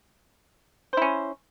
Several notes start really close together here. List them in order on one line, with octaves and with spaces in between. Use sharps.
C5 E4 C#4